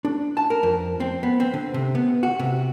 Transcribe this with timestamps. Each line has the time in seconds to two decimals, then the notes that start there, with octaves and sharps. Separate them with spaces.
0.05 D4
0.37 A5
0.50 A#4
0.63 F2
1.00 C4
1.23 B3
1.40 C4
1.53 D3
1.74 C3
1.95 B3
2.23 F#4
2.39 C3